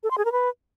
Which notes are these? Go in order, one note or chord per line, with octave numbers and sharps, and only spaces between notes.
A4
C6
G#4
A#4
B4